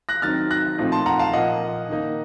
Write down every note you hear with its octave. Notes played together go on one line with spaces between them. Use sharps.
F#6 A#6
D#3 F#3 C4 D#4 F6 A6
F#6 A#6
A#2 F3 A3 C4 D#4
A5 C6
F#5 A#5
F5 A5
A#2 F3 A#3 D#5 F#5
D#3 A#3 D#4